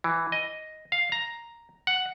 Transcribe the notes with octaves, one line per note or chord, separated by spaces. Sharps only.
E3
D#5
F5
A#5
F#5